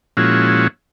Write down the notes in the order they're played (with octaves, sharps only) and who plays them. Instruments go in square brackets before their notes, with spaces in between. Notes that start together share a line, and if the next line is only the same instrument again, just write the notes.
[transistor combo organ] A#2 F3 G#3 C#4 E4 F#4